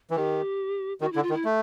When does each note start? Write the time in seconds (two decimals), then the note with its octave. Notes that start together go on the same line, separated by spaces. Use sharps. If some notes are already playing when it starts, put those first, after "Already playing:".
0.11 E3
0.16 D#3 G4
1.01 D#3 F#4
1.12 D3 E4
1.23 F4
1.30 D#3
1.34 E4
1.45 A3